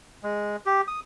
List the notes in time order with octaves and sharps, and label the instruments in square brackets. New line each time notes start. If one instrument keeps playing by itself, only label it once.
[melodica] G#3
G4
D#6